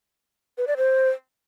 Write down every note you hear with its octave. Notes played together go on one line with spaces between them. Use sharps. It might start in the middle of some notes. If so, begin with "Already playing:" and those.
B4
D5
C5